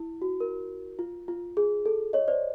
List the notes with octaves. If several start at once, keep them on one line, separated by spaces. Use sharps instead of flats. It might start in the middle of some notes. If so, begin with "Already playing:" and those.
Already playing: E4
F#4
A#4
F4
F4
G#4
A4
C#5 D#5
C5 D5